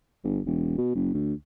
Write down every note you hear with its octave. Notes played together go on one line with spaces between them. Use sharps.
G1
E1
B2
F#1
D2